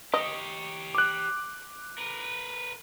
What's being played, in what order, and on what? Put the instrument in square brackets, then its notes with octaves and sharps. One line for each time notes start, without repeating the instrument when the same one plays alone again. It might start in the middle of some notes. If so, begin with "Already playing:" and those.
[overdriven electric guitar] G4 C#5 [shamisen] D#5
[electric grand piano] D6 F#6
[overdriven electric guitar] A#4 B4